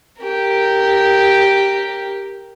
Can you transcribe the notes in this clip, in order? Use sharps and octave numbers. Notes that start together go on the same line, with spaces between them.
G4 A#4